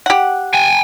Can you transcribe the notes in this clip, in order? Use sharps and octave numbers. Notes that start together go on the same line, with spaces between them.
G4 F#5
G5 G#5